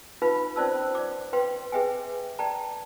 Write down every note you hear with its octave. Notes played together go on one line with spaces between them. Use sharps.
D#4 F4 B4 F5 B5
C#4 F4 C5 D5 A5 E6
D5 D6
B4 F5 G5 C6
G#4 B4 E5 G5 G#5
D5 G5 A5 A#5